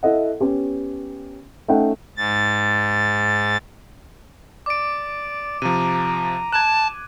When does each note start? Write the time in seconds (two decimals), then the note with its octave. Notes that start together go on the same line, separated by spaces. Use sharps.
0.03 E4 A4 D#5 F#5
0.40 B3 C#4 G4
1.68 A3 C#4 D#4 D#5 F#5 G5
2.16 G#2 A6
4.66 D5 D6 D7
5.62 C3 F3 A#5 D#7
6.52 A5 F#6 G#6